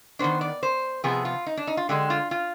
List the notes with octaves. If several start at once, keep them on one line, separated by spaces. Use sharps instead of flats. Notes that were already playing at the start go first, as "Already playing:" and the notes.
D#3 B3 D4 C5
D5
C5
C3 F3 B3 G#4
F4
D#4
D4
D#4
F4
D3 G#3 D4 G4
F4
F4